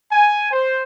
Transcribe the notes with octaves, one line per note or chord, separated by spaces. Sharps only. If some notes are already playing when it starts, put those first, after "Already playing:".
G#5
C5